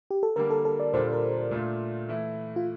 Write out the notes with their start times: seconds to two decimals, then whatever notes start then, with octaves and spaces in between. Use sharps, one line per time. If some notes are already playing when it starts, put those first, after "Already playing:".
0.11 G4
0.23 A4
0.36 D3 G3 A#3 A#4
0.50 A4
0.65 A4
0.80 D5
0.93 A#2 G3 D4 F4 C5
1.13 A#4
1.51 A#2 A3 D4 F4
2.08 E3 A3 E4
2.56 F4